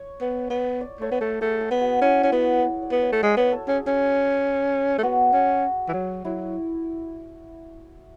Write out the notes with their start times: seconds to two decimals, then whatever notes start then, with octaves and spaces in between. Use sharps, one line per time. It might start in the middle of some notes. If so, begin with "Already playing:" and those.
Already playing: C#5
0.21 B3
0.50 B3
0.81 D5
1.01 A3 C#5
1.12 B3
1.21 A3 A4
1.41 A3 G#4
1.61 G#4
1.71 B3
1.81 F#4
2.01 C#4 E4
2.24 C#4
2.32 B3 F#4
2.62 B4
2.82 D5
2.92 B3
3.02 C#5
3.12 A3
3.22 G#3 D5
3.37 B3 C#5
3.52 A4
3.68 C#4 G#4
3.87 C#4
4.98 A3
5.03 B3 F#4
5.33 C#4
5.88 E3
5.94 F#3
6.25 F#3 E4